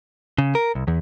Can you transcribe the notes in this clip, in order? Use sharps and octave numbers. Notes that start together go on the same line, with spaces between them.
C#3
A#4
C2
E2